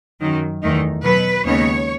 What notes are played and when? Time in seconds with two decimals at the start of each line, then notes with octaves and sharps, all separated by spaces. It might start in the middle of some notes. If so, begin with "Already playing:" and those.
0.20 F#2 D#3 F#3
0.62 E2 D#3 A3 D#4
1.04 B2 F#3 B3 B4
1.45 D#2 C#3 G#3 B3 D#4 C#5